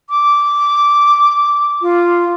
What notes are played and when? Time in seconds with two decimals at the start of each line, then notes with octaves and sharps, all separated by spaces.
0.10 D6
1.82 F4